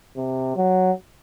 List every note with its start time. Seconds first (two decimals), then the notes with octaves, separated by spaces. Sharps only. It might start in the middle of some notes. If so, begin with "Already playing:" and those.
0.17 C3
0.56 F#3